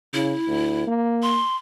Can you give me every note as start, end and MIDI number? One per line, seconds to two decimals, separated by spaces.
0.14 0.34 49
0.14 0.84 64
0.48 0.85 38
0.87 1.40 58
1.22 1.56 84